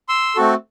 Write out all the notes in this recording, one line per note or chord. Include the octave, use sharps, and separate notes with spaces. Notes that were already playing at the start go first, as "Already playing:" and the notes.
C6 E6
A3 C4 F#4 A4